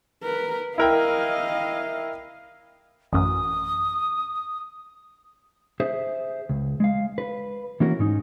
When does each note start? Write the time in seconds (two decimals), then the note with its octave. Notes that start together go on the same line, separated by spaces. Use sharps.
0.23 A#4 B4
0.78 E4 A#4 D#5 F5 G5
3.13 A1 F#2 D#6
5.80 G#4 C5 E5
6.49 C#2
6.80 G#3 F5
7.18 B4
7.80 E3 A#3 C#4 F#4 A#4
7.99 G#2 C#4 D#4